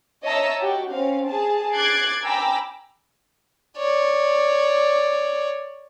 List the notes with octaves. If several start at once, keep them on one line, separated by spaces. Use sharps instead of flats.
C#5 D#5 E5 A5 A#5 E6
F#4 G4
C4 C#4 F5
G#4 A5
D6 F#6 G#6 A6 C7 D7
G5 G#5 A#5 B5 D6 E6
C#5 D5